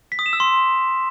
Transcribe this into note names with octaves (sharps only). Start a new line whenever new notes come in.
B6
D#6
E7
E6
C6